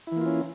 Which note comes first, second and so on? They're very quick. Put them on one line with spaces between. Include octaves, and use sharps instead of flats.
E4 E3 A#3 F4 C#4